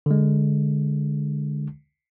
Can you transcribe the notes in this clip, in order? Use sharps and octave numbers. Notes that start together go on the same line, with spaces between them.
D3 G#3